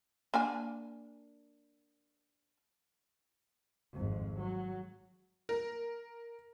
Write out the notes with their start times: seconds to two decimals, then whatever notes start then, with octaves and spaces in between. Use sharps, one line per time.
0.34 A#3 D4 G#5
3.92 G#1 F2
4.39 F#3
5.49 A#4